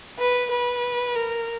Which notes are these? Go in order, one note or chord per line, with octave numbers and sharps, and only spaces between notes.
B4
B4
A#4